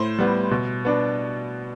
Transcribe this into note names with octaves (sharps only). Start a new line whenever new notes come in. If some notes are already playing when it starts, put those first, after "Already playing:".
Already playing: A2 C5
G3 B3
B2
B3 D4